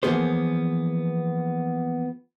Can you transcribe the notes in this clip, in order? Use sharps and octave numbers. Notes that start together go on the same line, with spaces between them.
E3 F3 A#3 B3 G#4 C5